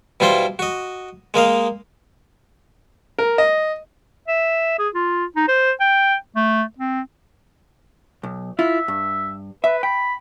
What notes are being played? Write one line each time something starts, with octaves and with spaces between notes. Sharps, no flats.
B2 G3 E4 F4 C5 C6
F#4 D#5
G#3 A#3 D#5 F5
A#4
D#5
E5
G#4
F4
D#4
C5
G5
A3
C4
B1
E4 F4 E5
G2
B4 E5
G5 B5